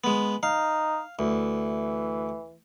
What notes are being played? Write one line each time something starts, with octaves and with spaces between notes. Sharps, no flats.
G#3 B3
D#4 F5
D2 E3